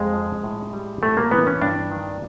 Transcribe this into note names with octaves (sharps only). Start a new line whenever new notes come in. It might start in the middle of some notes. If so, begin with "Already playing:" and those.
Already playing: F2 G#3
F3
A2
G3
A2 A3
A#3
E3 B3
C#4
G2 D4
D#3